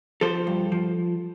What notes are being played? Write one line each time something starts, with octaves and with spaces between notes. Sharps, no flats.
F3 A4 C5
G2
F3